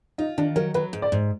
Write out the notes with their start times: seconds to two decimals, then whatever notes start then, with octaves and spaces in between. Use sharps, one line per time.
0.18 D#4 F4
0.38 D#3 D4
0.56 F#3 A#4
0.74 F#3 B4
0.93 G#2
1.02 D5
1.12 G#2